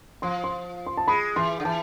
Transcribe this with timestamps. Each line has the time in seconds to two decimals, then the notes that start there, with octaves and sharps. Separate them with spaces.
0.22 F3 C6
0.44 C6
0.86 C6
0.97 A5
1.08 G#3 B5
1.36 E3 C6
1.60 D3
1.65 E3 A5